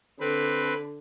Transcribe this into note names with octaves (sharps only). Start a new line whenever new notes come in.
D3 C4 B4